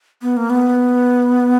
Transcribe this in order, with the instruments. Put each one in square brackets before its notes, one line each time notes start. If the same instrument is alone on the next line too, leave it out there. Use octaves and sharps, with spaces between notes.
[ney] B3
A#3
B3